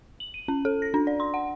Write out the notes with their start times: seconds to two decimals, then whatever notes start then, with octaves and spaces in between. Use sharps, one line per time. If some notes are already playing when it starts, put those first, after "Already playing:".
0.20 F#7
0.34 D#7
0.48 C#4
0.65 A4
0.82 A#6
0.94 D4
1.07 D5
1.20 C6
1.34 F#5